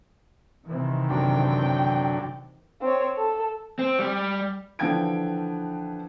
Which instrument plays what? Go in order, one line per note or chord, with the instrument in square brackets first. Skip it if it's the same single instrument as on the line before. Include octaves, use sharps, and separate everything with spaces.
[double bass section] C3 D#3 E3
[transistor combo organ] F#2 D3 [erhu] G5
[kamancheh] C4 C#5
A4
[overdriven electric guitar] C4
G3
[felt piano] D3 E3 F3 G5 G#6 D7